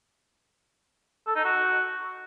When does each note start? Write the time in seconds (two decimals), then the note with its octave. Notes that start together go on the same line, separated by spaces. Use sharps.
1.27 A4
1.36 D#4
1.45 F#4